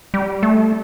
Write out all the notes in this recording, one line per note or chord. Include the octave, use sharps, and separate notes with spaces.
G3
A3